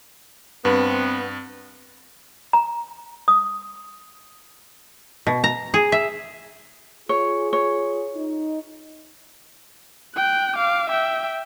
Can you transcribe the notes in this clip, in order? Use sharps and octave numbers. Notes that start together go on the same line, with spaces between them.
G2 B3 C4
A#5
D#6
B2
A#5
G#4
E5
F4 G#4 C#5
C#5
D#4
G5 F#6
F5 D6
E5 G5